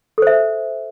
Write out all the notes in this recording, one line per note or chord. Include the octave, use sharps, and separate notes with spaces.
A4 C5 E5